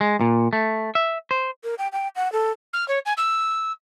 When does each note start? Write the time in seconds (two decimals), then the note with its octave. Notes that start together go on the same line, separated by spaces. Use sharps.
0.01 G#3
0.21 A#2
0.53 A3
0.95 E5
1.31 C5
1.64 A#4
1.78 G5
1.92 G5
2.16 F#5
2.32 A4
2.73 F6
2.88 C#5
3.05 G#5
3.17 E6